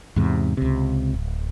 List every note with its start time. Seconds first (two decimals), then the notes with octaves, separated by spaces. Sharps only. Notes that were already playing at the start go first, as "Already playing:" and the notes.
0.16 E2 G#2 C3
0.57 C#2 C3
1.14 D1